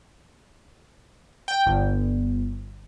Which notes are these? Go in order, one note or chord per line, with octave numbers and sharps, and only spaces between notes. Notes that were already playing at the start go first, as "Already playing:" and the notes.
G5
G1